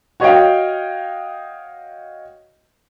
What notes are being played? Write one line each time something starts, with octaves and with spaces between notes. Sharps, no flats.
F#4 C#5 D#5 F5 G5